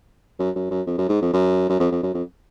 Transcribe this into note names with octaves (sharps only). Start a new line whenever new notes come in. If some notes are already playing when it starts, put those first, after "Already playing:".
F#2
F#2
F#2
F2
F#2
G#2
F2
F#2
F#2
F2
F2
F#2
F2